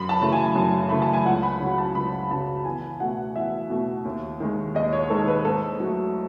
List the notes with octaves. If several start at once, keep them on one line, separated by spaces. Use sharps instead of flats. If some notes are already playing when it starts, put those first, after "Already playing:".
Already playing: F#2 B5
A5
C#3 E3 A3
G#5
F#2
C#3 E3 A3 B5
A5
G#5
C#2 F#5
B5
C#3 F#3
A5
C#2 B5
C#3 F#3 A5
E2 G#5
B2 A3 F#5
E2 E5
B2 A3
D#2
D#3 G#3
D#2 D#5
C#5
D#3 G#3 A4
B4
G#2 A4
F#3 A3